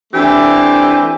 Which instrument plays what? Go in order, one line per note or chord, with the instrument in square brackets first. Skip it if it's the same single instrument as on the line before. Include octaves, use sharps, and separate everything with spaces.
[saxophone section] E3 A3 C4 D4 G4